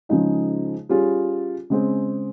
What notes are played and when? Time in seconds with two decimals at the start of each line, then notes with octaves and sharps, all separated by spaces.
0.09 C#3 F3 G#3 D#4 G#4
0.89 G3 C#4 F4 G#4
1.70 C#3 G#3 C4